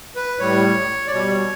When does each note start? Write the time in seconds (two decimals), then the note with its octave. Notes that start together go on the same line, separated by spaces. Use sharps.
0.16 B4
0.39 A2 G3 C#5
1.07 D5
1.11 B2 G3 C#5